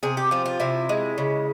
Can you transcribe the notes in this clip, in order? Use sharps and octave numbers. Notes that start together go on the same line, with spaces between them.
C3 G#4
G4
F3 F4
F4
C3 E4
G#3
C#3